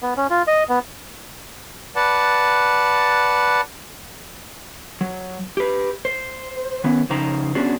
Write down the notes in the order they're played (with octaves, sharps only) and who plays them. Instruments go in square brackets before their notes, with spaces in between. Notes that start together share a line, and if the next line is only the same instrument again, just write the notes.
[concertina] B3
C#4
F4
D#5
B3
[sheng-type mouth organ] B4 D5 F#5 A5
[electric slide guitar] F#3
G4 B4
C5
D#3 B3 C#4
F2 C#3 D#4 C5 G5 A#5
B3 C#4 D4 F#4 G#4